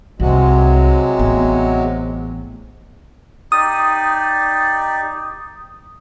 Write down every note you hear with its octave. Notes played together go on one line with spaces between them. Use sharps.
C2 C3 F#3 G#3
A1 B3
D#4 G4 D5 D#6